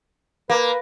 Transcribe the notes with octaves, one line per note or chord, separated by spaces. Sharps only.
A#3 B4